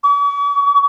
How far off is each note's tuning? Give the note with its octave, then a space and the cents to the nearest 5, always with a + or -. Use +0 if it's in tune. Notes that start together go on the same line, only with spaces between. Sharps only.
C#6 +45